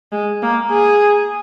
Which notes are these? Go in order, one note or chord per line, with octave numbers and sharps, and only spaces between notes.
G#3
A#3
G#4